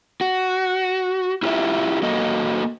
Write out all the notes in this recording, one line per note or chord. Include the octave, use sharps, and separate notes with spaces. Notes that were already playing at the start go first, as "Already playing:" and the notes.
F#4
E4 F4 G4 A#4 E5
A#3 F#4 A4 D#5